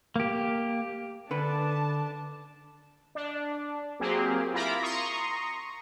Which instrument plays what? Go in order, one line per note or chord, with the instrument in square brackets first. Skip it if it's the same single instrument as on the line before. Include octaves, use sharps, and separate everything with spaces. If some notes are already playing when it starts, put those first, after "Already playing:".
[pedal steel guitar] A#3 G4
[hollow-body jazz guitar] D3 B4 [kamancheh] D4 A5
[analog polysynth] D4
F#3 A#3 C4 G4 G#4
E4 F4 A#4 A#5 B5 D6
A#5 C6 C#6 D#6